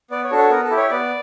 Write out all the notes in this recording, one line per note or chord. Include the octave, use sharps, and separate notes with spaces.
B3 D5
C#5
D4 F#4 A4
C#5
B3 A#4
A4
E4 G4
C#5
B3 D5